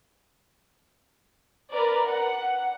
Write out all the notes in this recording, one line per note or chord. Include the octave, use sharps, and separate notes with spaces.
A#4 B4 D5
F#5